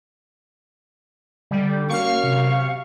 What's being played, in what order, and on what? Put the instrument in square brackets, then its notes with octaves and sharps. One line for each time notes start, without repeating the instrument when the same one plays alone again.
[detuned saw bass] D3 [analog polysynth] G3
[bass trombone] F#2 [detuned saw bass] A#3 [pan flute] F5 [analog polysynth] C#6 F6
[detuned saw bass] C3